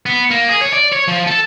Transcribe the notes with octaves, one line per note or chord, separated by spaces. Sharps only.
B3
A#3
G#4
C#5
D5
C#5
F3
A4